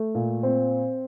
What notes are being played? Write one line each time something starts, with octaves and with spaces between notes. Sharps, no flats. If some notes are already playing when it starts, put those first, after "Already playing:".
Already playing: A3
A#2
C4